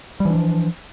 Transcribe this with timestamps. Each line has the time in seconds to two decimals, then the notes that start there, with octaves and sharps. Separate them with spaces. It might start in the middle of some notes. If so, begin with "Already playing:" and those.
0.20 G3
0.25 E3
0.30 D4
0.35 F3